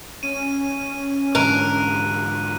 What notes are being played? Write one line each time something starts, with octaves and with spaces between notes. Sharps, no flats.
C#4 D#7
G#2 D3 E3 A#4 F#6 D#7